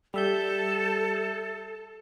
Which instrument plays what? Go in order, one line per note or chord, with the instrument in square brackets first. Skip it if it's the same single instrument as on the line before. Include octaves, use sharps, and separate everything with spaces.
[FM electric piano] G3 E5 G6 [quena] A4